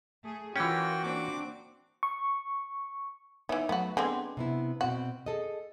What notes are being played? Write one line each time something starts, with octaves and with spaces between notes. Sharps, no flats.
A3 G#4
E3 C#4 F4 F#4 A#4 G5
A#3 C4 D4 D6
C#6
E3 B3 D#4 C#5 E5
F#3 A3 B3 F#4
D3 G#3 B3 C4
C3 B3 E4
B2 C4 F#4
G#4 A4 D#5